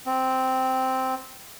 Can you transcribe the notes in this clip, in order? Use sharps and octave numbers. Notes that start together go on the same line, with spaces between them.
C4